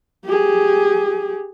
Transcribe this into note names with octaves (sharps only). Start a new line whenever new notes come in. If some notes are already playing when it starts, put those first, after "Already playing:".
G4 G#4